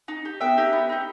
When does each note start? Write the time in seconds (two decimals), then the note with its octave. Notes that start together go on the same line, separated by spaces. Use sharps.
0.08 D#4
0.25 G4
0.41 B3 E5 G5
0.57 D#4 G4
0.73 B3
0.89 D#4 G4